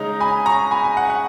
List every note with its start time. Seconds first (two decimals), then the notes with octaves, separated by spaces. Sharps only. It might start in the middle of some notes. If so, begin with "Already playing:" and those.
Already playing: C#3 G#3 D#4 A#5
0.20 G#5 B5
0.46 A#5 C#6
0.71 G#5 B5
0.84 G#5
0.97 F#5
1.10 F#5